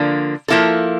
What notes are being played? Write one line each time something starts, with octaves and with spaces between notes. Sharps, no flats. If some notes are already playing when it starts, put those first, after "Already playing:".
Already playing: D3 F3 A#3 D4
F3 A#3 E4 A4